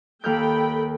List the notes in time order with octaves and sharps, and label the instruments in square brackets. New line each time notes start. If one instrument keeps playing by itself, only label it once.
[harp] D#2 F6 G6 [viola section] A4 G5 B5